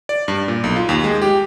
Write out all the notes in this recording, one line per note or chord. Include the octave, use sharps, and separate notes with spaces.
D5
G2
A#2
B1
F4
D#2
G#3
G4